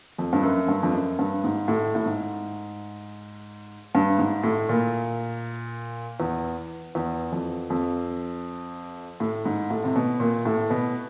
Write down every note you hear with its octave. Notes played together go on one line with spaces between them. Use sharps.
F2
G2
F#2
G2
F2
F#2
G2
G#2
A2
A2
G#2
G2
G#2
A2
A#2
E2
E2
F2
F2
A2
G#2
A2
C3
B2
A#2
A2
B2